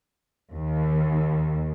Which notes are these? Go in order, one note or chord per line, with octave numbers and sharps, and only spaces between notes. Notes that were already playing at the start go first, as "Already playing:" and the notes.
D#2